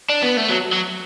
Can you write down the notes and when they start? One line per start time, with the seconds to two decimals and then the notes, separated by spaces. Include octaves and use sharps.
0.09 D4
0.23 B3
0.37 A3
0.50 F#3
0.73 F#3